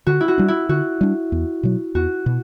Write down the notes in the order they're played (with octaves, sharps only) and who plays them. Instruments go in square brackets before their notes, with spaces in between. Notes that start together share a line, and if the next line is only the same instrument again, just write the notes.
[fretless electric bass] D3 [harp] F#4
[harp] E4
F#4
[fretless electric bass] G3 D4
[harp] E4
[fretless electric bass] D3 [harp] F#4
[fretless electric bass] G3 D4
E2
B2 F#3
[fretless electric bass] E2 [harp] F#4
[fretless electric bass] B2